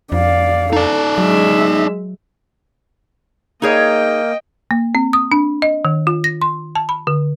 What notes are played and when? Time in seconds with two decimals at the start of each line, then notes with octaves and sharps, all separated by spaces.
0.12 F2 D5 F5
0.73 D#4 A4 D5
1.18 F#3 G#3 E5
3.62 A#3 D#4 G#4 C#5 D#5 G5
4.71 A#3
4.95 C4
5.13 D#6
5.32 D4
5.62 D#5
5.85 D#3
6.07 F4
6.24 A#6
6.42 C6
6.75 A5
6.89 B5
7.07 D3